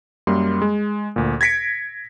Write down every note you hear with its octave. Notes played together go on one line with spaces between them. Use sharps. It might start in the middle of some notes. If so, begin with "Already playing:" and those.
F#2 G3 A#3 C6
G#3
D2 A#2
G#6 A#6 B6 C#7 D7